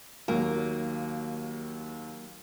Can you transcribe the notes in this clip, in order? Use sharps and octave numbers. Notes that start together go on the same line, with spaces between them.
D#2 F#3 A#3